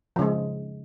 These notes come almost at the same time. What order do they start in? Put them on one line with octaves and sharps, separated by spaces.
F3 C#3 G#3